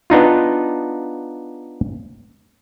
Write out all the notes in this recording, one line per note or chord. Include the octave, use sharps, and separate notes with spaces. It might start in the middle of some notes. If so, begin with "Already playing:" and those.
B3 D4 D#4 F4